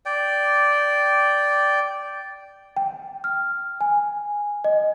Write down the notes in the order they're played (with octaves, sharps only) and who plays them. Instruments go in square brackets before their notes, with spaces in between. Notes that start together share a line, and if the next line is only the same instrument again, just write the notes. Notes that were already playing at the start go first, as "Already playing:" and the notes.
[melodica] D5 G5
[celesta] G5
F6
G#5
D#5